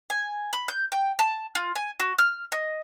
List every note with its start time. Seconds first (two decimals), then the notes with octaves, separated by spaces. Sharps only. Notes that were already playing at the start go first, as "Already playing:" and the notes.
0.10 G#5
0.53 B5
0.68 G6
0.92 G5
1.19 A5
1.55 F4
1.75 G#5
2.00 F#4
2.18 F6
2.52 D#5